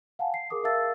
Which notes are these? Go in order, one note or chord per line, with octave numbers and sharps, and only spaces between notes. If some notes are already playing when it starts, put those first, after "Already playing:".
F5 F#5 G#5 A5
C7
G#4 A#4 D6 D#6
A#4 E5 F5 A5 E6 A6